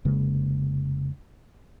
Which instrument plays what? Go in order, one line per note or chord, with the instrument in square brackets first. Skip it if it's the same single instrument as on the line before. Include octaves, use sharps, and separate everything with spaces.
[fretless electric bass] F1 C#3 G#3 A#3